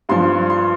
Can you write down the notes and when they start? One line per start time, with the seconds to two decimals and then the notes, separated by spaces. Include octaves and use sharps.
0.09 G2 F3 C6
0.50 C6